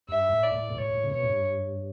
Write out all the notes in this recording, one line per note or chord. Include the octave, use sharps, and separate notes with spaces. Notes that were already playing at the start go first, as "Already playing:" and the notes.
G2 E5
A2
D5
A2
B2
A2 C#5
A2
C#3
B2 C#5
A2
G2